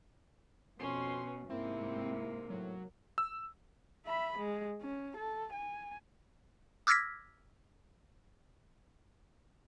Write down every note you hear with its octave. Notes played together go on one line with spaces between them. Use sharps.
F2 B2 C#4 C6
G#2 C3 A#3 C4 E4
A2 F#3
E6
E5 B5
G#3
C#4
A4
G#5
D6 E6 F6 G#6 A#6 B6